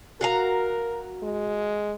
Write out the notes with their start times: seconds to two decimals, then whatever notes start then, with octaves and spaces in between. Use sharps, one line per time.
0.21 F#4 A#4 F5 A#5
1.23 G#3